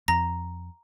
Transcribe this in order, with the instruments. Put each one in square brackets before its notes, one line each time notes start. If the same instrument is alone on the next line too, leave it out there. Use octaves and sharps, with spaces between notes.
[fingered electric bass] F2 [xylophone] A#5 A#6